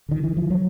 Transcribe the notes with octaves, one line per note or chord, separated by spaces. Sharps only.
D3 D#3
E3
F3
F#3